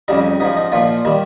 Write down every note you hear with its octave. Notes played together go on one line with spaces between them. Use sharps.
F2 C#3 G3 D#4
G#2 F3 D#4
D#4
A#2 F3 F4
D#3 G3